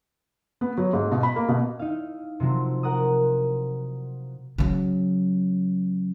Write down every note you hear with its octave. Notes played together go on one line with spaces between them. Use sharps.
B3
F#3
G#2
B2
B5
A#3
B2
D#4 E4 F5
C3 F3 F#3 C4
A#4 F#5 A#5 D#6
C#3 F#3